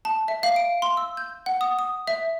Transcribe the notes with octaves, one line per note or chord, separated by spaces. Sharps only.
A5
E5
F5
D7
C6
E6
G6
F#5
D#6
D#6
E5